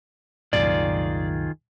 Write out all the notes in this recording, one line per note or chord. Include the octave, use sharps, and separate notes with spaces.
C2 F#2 A#2 D#3 F4 G#4 D5